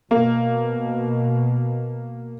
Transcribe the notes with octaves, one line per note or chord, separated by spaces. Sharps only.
B2 A#3